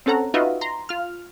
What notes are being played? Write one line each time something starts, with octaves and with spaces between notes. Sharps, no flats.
C4 C#4 A4 F#5 A#5
D#4 F4 F#4 B4 D#5 E5
A#5 C6
F4 F6